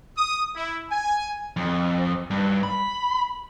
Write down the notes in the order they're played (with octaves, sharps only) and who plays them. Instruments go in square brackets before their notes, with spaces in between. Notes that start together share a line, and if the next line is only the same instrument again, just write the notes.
[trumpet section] D#6
E4
G#5
[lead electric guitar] F2
G2
B5